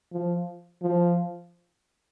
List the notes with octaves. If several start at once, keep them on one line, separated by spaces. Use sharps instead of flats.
F3
F3